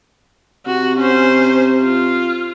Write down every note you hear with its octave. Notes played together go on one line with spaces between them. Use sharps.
C3 F#4
C#4 C5
F4